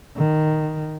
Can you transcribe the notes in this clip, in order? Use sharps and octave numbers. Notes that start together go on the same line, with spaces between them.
D#3